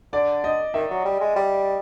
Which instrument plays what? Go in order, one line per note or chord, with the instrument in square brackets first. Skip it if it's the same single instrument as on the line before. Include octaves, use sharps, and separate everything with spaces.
[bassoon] D3 [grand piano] D5
[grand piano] D#5
[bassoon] D#3 [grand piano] E5
[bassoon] F#3
G3
G#3
G3